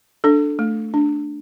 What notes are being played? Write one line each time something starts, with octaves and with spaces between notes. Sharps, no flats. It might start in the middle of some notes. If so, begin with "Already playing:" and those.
D4 A4
A3
D4